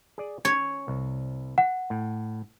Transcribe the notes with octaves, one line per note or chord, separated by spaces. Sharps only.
G#4 D5
C#4 C#5
C2
F#5
A2